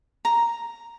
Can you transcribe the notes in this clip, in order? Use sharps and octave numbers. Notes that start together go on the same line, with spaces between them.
A#5